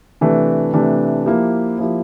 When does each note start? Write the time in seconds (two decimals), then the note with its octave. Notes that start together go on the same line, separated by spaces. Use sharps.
0.21 C3 E3 A3 D4
0.73 C3 E3 A3 D4
1.26 F3 A#3 E4 G4
1.78 F3 A#3 E4 G4